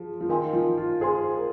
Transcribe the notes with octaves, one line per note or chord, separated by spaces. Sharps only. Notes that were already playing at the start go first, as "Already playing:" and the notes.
Already playing: F3 G#4
F3
D#3 A#4 F5 G#5 C6
F3
F4
G#4 C5 G#5 C6
A#4